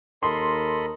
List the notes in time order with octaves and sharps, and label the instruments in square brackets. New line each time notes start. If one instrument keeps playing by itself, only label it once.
[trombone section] D#2 A#4 [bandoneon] A4 D#5 B5 [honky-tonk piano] C6